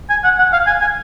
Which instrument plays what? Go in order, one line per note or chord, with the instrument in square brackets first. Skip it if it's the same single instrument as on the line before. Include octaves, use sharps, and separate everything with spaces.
[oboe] G#5
F#5
F#5
F5
G#5
G#5